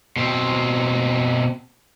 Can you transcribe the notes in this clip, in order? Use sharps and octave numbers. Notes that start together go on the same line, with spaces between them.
B2 C4